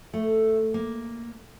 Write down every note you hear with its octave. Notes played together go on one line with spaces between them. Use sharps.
A3
A#3